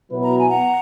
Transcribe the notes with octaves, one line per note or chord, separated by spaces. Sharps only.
B2 F#3 B3 E4 B4
A#5
G#5
F#5 A#5